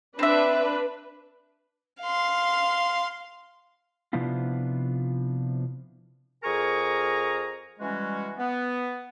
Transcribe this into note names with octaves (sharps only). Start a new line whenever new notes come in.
C4 D4 B4 E5
F5 C6
C3 F3 B3 D4 E4 F4
F2 G#4 A#4 G#5 A#5 C#6
E3 G3 G#3 C#4 F#4
B3